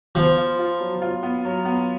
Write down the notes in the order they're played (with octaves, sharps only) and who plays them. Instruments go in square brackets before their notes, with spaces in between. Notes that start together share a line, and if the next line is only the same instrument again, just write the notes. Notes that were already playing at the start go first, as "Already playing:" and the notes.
[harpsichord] F3 [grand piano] B3
[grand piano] F4
F4
F#3
F4
B3
F#3
B3